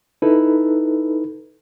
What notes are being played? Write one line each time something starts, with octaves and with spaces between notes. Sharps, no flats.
D#4 E4 A4 B4